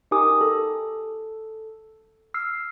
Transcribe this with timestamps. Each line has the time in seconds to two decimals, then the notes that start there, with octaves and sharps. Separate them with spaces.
0.11 D#4 G4 A#4 G#5 D6 D#6
0.41 A4
2.34 E6 F6 C7